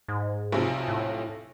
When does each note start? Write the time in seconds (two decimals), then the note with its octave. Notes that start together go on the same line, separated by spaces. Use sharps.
0.08 G#2
0.52 B1 C3 F3
0.88 A2